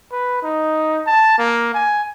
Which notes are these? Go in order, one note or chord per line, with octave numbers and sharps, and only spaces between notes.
B4
D#4
A5
A#3
G#5